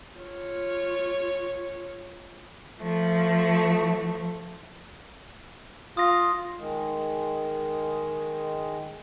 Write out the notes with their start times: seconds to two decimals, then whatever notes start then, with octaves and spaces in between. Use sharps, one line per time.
0.17 F4 C#5
2.80 F3 A3
5.97 F4 D#6 A#6
6.58 D#3 G#3